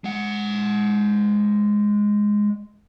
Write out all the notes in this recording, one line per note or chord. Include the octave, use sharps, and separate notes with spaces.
G#3 F#5